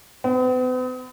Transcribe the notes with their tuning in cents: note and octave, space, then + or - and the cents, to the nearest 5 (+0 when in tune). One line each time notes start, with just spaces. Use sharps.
B3 +45